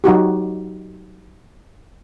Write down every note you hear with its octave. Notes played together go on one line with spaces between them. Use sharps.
F#3 D#4 F#4 G4